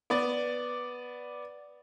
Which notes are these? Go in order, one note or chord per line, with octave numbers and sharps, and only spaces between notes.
B3 D5